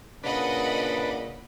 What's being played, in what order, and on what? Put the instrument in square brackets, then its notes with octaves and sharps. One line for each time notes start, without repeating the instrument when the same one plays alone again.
[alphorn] A#2 [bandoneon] C#3 [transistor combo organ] D4 B4 [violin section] D#5 F#5 B5